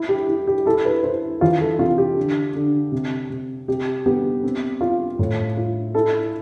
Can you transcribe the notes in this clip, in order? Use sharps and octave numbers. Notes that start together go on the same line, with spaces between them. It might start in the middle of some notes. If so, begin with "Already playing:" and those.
Already playing: E4
G4
E4
G4
E4 A4
B4
E4 C5
E3 F4
A4
C3 F4
G4
D3
D3
C3
C3
C3 G4
B3 G4
C4
F4
A2
F4
E4 A4